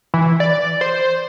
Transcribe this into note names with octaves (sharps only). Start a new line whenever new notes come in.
E3
D5
C5